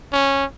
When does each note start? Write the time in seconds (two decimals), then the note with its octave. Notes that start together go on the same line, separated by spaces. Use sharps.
0.13 C#4